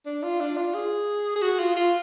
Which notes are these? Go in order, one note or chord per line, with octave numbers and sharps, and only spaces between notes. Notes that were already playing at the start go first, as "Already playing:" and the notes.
D4
F4
D4
F4
G#4
G#4
F#4
F4
F4